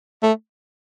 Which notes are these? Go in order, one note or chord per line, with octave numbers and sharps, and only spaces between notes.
A3